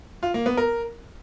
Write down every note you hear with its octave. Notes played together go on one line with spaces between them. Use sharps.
F4
A#3
B3
A#4